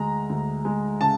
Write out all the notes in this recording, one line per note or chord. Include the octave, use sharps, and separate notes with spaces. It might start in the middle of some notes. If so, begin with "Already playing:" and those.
Already playing: D2 G#3 A#5
D2
G#3
C#3 A5